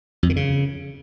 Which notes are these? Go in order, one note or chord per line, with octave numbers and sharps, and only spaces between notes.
F2
D#3
C#3